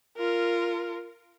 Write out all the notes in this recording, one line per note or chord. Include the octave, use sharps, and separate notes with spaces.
F4 A#4